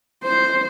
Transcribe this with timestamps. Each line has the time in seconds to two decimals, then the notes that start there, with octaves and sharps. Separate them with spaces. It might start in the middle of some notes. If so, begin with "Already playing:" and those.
0.24 C5